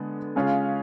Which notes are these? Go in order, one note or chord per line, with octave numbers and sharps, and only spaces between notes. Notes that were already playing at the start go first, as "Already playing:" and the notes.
Already playing: D3 G#3 B3
C#3 G#3 C#4 F4 G#4